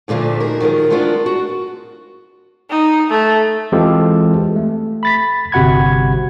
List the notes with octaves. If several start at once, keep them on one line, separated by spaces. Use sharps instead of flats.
D2 A#2 D3 F3 A3
D#4 F#4 G#4 A#4
D#3 F3 F#3 G#3 A#4
G#3 A3 B3 D4 F4 A#4
F#4
D#4
A3
E3 G#3 C4 F4 G4 A4
A3
B5 A6 B6
G1 C3 F#4 F#5 B5 G#6